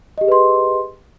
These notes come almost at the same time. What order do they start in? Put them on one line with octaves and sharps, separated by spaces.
D#5 G4 G#4 B4 C6